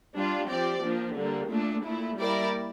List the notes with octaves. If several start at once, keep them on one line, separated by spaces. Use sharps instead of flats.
G3 D4 F4
F3 C4 G4 D5
F3 A#3 D4
D3 G3 A#3
A#2 A3 D4
A#2 A3 E4
G3 A#3 E4 A#4 D5